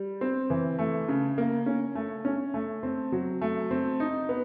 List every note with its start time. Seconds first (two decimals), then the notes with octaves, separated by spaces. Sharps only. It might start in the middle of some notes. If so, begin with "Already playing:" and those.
Already playing: G3
0.21 C4
0.50 E3
0.79 A3
1.08 C#3
1.38 A#3
1.66 C#4
1.95 A3
2.25 C#4
2.54 A3
2.83 C4
3.12 F#3
3.41 A3
3.71 C4
4.00 D#4
4.29 B3